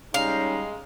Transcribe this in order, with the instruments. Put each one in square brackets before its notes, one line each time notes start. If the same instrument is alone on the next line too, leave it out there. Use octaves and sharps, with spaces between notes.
[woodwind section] G3 D#4 [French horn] G#3 [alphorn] C#4 [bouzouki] F5